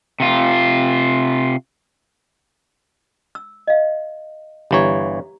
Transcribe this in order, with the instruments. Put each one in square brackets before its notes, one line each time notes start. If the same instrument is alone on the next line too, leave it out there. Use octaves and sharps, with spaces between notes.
[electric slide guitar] C3 F4
[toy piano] E6
D#5 F5
[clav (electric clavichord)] G1 E3 C#5 [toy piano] G4 A#5